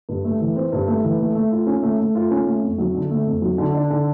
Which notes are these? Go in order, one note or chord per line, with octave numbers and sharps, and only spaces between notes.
G2
A3
E3
C4
G2
A3
E3
A3
A3
F4
C#4
A3
A3
F4
C#4
A3
F2
F#3
D3
A3
F2
F#3
D3
D4
D3